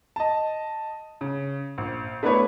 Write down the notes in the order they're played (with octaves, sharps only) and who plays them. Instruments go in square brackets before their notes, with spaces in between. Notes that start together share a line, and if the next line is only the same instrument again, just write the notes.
[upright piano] D#5 A5
C#3
A#1
A3 B3 D4 E4 B4 C#5